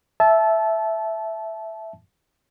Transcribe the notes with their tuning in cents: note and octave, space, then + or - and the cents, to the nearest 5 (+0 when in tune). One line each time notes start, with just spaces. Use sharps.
E5 +0 A5 -20